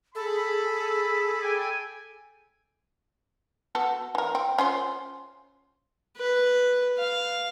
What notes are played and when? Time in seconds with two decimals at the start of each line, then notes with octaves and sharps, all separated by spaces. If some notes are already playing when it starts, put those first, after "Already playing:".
0.15 G#4 A4 B5
1.41 D5 G5 G#5
3.75 B3 F#4 A4
4.15 E3 A#4
4.35 C4
4.58 C#4 F4 C5
6.17 B4
6.98 F5